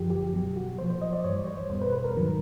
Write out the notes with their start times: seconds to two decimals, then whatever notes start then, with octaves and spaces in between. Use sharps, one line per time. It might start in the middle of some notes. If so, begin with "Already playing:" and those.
Already playing: F#2 D3 F3 G4
0.10 G4
0.33 B2 F#3
0.56 F#4
0.78 A#2 F3 C5
0.90 C5
1.01 D#5
1.13 D5
1.24 G2 E3 G3 C#5
1.47 C5
1.70 E2 B2 G3 C5
1.81 B4
1.92 B4
2.04 A#4
2.15 G#2 D#3 F#3